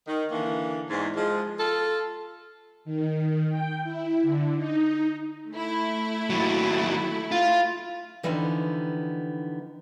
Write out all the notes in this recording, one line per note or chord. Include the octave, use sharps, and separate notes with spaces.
D#3
D3 E3 A#3
E2 G#2
F3 G#3
F4 A4
D#3
G5
E4
D3
D#4
A3 E4
D#2 F#3
F4
D3 E3 F3 B3 D#4 G4